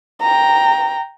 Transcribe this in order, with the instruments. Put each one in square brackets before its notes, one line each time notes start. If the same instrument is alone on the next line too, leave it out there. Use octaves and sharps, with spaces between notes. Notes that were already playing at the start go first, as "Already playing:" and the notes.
[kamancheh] G5 A#5